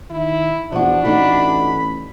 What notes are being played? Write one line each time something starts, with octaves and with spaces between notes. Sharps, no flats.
D#3 E4
E2 F3 D4 F#4
A1 A3 D#4 F#4 B5